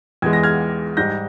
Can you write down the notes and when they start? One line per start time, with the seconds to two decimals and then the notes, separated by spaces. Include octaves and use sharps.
0.22 E2 E3 G#3 G#6
0.33 A#6
0.43 F6 G#6
0.97 G#2 G3 G6 A#6